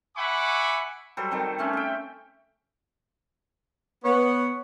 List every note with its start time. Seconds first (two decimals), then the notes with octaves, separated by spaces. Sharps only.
0.17 E5 F#5 G#5 B5 C#6 D6
1.17 F#3 G3 A4 C5
1.31 D#3 G3 C4
1.58 A3 C4 C#4
1.73 E5 G5
4.04 B3 C#5